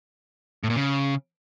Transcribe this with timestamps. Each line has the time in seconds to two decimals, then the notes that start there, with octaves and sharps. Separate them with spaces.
0.64 A2
0.70 A#2
0.76 C#3